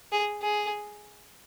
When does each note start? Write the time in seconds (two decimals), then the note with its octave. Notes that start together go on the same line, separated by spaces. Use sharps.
0.12 G#4
0.42 G#4